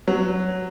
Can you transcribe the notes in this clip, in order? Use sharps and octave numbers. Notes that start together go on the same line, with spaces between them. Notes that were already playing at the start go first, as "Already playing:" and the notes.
F#3